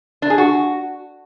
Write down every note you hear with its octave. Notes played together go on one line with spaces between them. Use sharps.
D4
G#4
F#4